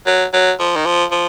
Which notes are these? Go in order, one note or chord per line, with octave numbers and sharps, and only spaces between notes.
F#3
F#3
F3
D#3
F3
F3